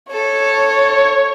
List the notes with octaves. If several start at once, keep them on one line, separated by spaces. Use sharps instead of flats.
A4 C#5